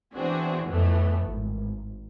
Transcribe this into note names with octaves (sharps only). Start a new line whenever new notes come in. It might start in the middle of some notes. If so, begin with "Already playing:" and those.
E3 B3 C4 D4 F#4 G#4
F2 A2 E3 A3 B3
G#1